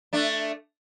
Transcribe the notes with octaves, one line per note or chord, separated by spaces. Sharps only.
A3 D4